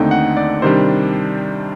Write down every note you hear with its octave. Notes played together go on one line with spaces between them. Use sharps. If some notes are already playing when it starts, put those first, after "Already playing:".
Already playing: D#2 D3 A3 C4 D#4 G5
F#5
D5
C3 D#3 G3 D4 C5